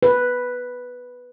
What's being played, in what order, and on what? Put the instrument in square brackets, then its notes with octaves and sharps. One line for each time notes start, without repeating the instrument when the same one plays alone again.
[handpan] B4